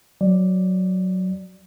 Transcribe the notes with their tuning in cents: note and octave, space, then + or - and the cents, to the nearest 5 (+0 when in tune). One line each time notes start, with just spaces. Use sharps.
F#3 +0 D5 +5